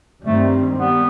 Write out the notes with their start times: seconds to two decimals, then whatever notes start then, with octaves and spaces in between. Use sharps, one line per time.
0.24 G2 D#3 G3 A3 C4
0.78 G3 B3